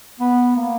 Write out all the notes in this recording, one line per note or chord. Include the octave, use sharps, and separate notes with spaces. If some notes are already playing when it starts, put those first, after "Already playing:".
B3
A#3